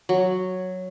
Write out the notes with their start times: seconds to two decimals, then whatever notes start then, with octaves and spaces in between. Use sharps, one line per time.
0.09 F#3